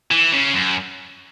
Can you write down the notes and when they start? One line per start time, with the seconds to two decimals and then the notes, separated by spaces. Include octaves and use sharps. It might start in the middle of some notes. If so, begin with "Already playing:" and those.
0.11 E3
0.33 C#3
0.54 F#2